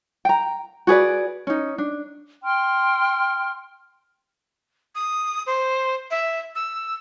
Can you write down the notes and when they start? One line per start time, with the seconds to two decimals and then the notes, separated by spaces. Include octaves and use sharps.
0.25 G5 A#5
0.87 F#4 G#4 B4 D5
1.47 C#4 D#4
1.78 D4
2.44 G5 C6 F6
4.95 D#6
5.46 C5
6.11 E5
6.55 E6